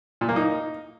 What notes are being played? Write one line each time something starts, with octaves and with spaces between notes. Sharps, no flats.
A#2
A#3
D#4